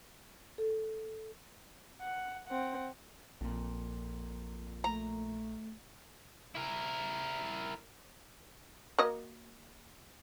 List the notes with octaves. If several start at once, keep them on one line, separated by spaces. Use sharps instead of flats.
A4
F#5
C4 F#5
A#1 F2 A#2
A3 A#5
E4 A#4
A#3 F#4 D#5